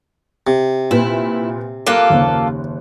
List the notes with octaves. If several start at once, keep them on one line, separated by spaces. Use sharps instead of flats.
C3
A#2 E4 B4
A#3 F4 A4 D6 F#6
F#1 D#2